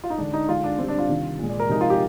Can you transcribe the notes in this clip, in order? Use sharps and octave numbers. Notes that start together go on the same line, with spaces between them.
F4
D#4
D3 G#3 D4
D#4
D3 G#3 F4
D4
D3 G3 C4
D4
F4
C3 D#3 G3
A#2 G#3
D5
A#4
C3 F3 G#3 D#4
F4
G4